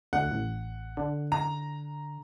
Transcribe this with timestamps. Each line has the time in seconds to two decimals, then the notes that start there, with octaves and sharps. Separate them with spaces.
0.13 D2 F#5
0.31 A1
0.97 D3
1.32 A#5